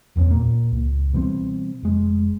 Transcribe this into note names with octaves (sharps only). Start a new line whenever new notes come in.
D#1 E2 D#3 C#4
A#2 A#3
C#2
B2 E3 G3 C4
F1 G#3